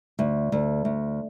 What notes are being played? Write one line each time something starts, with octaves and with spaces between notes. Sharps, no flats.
D2
D2
D2